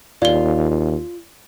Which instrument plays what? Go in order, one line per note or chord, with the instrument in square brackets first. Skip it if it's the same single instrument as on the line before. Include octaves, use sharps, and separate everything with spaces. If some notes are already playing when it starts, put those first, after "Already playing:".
[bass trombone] D#2 [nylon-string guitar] F4 [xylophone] D5 G7